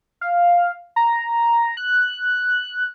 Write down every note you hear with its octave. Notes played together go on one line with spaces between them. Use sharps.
F5
A#5
F#6